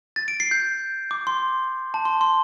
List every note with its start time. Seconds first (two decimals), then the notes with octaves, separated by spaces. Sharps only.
0.16 A6
0.28 D7
0.40 C7
0.51 G6
1.11 D6
1.27 C6
1.94 A5
2.05 C6
2.21 C6